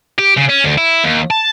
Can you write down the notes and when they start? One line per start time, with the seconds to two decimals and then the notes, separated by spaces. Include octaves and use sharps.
0.19 G4
0.37 C#3
0.49 C#4
0.64 D2
0.78 E4
1.04 D#2
1.30 A5